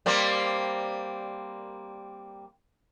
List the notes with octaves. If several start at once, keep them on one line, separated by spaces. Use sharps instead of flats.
G3 A#3 C4